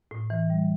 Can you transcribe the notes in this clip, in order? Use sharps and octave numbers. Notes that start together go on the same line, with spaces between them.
A2
E3
G3